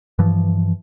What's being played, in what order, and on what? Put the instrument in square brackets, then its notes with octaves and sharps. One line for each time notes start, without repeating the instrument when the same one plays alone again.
[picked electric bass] G2 E3 F3